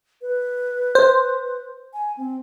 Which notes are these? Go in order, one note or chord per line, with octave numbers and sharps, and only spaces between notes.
B4
C5
G#5
C4